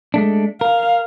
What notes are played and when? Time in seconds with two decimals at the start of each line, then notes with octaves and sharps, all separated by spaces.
0.14 G#3 A3 D4
0.61 A#4 F5